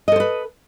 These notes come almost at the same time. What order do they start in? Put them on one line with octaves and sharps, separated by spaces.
D#5 A4 C5 B4